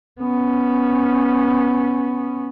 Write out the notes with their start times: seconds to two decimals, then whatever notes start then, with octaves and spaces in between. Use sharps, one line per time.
0.20 B3 C#4